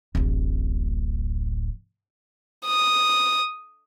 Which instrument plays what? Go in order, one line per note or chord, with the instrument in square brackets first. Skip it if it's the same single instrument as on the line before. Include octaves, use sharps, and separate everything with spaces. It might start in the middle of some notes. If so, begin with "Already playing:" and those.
[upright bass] D1 A1
[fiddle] D#6